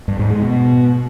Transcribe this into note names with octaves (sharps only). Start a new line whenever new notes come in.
G2
G#2
G#3
B2